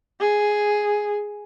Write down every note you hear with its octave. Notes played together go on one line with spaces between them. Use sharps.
G#4